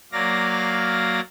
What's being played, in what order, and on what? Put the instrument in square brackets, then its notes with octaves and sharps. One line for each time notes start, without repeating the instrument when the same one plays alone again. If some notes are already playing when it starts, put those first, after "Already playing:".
[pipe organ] F#3 A#3 D5 F5 A#6